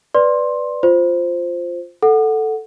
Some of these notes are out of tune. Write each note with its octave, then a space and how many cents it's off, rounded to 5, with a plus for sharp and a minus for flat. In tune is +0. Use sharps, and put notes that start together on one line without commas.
B4 +0 D5 +0 C6 +15
F4 +0 C5 +0
A4 +0 F#5 +0